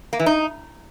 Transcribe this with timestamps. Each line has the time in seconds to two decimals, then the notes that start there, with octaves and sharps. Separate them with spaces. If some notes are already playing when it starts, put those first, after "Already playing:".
0.13 A#3
0.20 E3
0.26 D#4